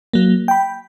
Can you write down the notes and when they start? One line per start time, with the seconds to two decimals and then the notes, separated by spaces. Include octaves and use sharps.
0.13 F#3 A#3
0.48 G5 B5